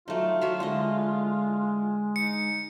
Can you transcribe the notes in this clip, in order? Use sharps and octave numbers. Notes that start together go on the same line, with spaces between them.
F#3 A3 D#4 F4
F#3 F#4 E5 F5
D3 G#3 E4 D#5
D#4 C#7